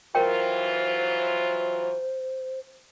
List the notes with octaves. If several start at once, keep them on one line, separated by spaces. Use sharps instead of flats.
E3 F#3 F4 A#4 C5 C#5 G5